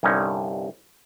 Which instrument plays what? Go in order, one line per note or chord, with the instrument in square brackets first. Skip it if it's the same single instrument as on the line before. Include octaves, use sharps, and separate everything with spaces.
[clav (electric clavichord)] C2 G2 D3 C#4 D#4